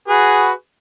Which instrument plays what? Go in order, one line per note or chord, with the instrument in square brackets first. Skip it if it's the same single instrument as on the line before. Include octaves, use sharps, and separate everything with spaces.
[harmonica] F#4 G#4 B4